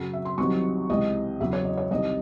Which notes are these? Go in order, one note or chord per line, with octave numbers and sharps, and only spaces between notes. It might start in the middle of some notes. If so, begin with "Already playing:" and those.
Already playing: F#2 C#3 F#3
E5
C6
C2 C3 D#3 F#3 C#6
C#2 C3 E3 D#5
E2 C#3 F#3 E5
C#5
D#5
C#5
C2 C3 D#3 D#5